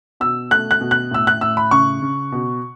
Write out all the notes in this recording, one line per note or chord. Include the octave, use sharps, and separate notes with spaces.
B2 E6
A3 F#6
F#6
B2
F#6
A2 E6
F#6
A2 E6
B5
C#3 C#6
C#3
B2